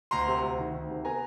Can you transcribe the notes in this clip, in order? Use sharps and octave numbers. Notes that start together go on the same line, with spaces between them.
D2 A#5 C6
C3
D2
D#3
D2
C3
B3 G#5 A#5